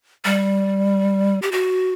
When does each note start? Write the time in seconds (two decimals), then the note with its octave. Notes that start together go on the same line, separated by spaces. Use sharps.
0.25 G3
1.42 G4
1.52 F#4